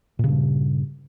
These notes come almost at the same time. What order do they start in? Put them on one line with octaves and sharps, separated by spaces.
A#2 C#3 G2